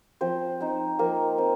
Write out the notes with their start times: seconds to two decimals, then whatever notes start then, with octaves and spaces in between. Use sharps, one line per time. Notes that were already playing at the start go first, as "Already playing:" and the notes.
0.21 F3 C4 C5
0.61 C4 D#4
0.99 F3 A#3 A#4
1.38 C4